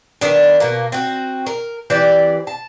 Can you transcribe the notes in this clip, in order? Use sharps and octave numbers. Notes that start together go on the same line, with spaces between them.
D#3 B3 D4
B2 A#3
C4 F#4
A#4
E3 C4 G4 D5
A5